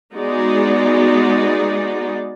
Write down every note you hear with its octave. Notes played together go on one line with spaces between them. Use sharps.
G#3 B3 D#4 F#4 G#4 D5